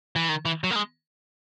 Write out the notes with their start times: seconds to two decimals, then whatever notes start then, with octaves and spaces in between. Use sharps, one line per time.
0.16 E3
0.29 D#3
0.45 E3
0.64 F#3
0.71 A#3
0.76 G#3